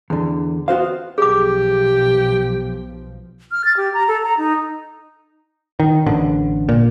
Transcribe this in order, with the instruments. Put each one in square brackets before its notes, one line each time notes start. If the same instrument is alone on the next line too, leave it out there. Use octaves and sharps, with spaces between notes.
[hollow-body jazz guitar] E2 D3
B3 F#4 C5 F5
[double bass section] B1 B2 F3 [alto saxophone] G4 [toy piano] G#4 D6
[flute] F6
A6
G4
A#5
A4
A#5
D#4
[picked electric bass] D#3
A1 D3
A#2